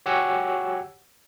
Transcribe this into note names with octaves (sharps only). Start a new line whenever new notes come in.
F#4 G4 C#5 F#5 G#5 E6